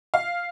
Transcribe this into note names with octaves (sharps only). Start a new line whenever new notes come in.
F5